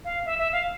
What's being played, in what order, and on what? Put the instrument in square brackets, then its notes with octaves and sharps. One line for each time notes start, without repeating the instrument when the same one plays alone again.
[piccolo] F5
E5
E5
F5